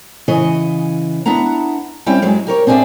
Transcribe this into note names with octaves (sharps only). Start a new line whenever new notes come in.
C#3 E3 C#5 D#5
B3 D4 E4 F#5 A#5
G3 C4 C#4 E4 G5
F#2 F#3 G#3
G4 A#4 C#5
C4 D4 G#4 B4 D5 E5